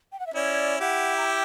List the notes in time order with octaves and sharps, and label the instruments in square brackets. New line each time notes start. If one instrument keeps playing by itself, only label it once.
[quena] G5
F#5
E5
[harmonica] C#4 E4 [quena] D5
[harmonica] E4 G4 [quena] F#5
[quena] A#5
G5